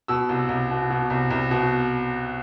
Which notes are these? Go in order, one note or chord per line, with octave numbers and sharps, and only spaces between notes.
B2 E6
C2
C2
B2
B2
C2
C2
B2